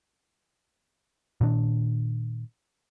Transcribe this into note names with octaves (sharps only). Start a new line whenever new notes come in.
A#2 D#3 D4